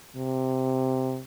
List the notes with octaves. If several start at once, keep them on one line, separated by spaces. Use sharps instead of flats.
C3